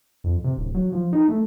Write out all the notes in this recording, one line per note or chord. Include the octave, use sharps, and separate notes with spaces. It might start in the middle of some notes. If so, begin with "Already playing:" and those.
F2
C3
D1
F#3
F3
D#4
A3